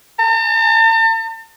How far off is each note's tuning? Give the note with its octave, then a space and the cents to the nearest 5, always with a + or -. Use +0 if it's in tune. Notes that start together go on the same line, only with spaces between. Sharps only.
A5 +45